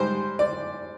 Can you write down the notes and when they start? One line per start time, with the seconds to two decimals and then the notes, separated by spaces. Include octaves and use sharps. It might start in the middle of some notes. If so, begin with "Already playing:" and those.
Already playing: G#2 G3 C5
0.39 D5